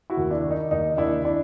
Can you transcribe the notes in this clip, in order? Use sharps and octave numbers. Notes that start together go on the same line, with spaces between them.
E4 F#4
D#2
D4 E4
D#3
D#4
D#2 D#4
D#2 D4 E4
D4 E4